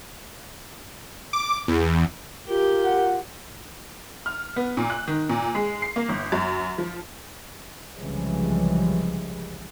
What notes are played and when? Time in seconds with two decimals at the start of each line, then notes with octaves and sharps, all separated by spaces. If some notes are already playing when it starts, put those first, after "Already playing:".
1.33 D6
1.68 E2
2.49 F4 G4 A#4
2.85 F#5
4.26 F6
4.56 B3
4.77 A#2
4.90 F#6
5.07 D#3
5.29 A#2
5.55 G#3
5.82 C7
5.96 A#3
6.09 G1
6.32 F#2
6.78 F3
7.96 C2 C#3 E3 F3 G3 G#3